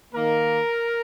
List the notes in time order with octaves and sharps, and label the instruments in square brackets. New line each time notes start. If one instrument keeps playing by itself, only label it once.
[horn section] D#3 A#3 A#4